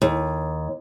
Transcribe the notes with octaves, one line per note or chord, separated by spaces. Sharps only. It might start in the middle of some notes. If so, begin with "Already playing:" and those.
D#2